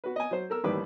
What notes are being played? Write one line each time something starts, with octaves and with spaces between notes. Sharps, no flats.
F#4 B4
D#5 G#5
F#3 C5
A4 A#4 E6
A1 D#2 D#3 G3 B4 D6